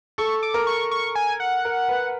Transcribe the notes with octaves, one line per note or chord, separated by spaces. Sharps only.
A4 C#6
D6
A#4
C#6
C#6
G#5
F#5
A#4
B4